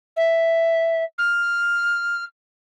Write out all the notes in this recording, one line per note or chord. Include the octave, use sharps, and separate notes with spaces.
E5
F6